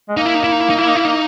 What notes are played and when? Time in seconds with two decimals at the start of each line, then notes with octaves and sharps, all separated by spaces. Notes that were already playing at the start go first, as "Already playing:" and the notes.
0.09 G#3
0.17 A#3 D#4
0.26 E4
0.35 D#4
0.44 E4
0.52 D#4
0.60 E4
0.70 D#4
0.79 E4
0.88 D#4
0.96 E4
1.05 D#4